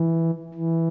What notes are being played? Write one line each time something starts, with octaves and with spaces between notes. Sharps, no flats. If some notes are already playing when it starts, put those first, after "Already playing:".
Already playing: E3
E3